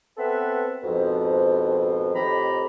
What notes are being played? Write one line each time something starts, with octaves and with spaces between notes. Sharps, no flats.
B3 C4 A4 B4 E5 F#5
F2 G#2 B2 F3
F2 A2 D#3 G4 A#5 B5